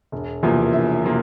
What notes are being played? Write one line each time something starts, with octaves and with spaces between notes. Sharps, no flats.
E1
E2 C3 F3 A#3
E1 E5
C3 F3 A#3